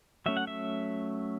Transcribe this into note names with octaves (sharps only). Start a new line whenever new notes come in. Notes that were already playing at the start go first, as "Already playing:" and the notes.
F#3 A3 C#4 E5
F#5
E5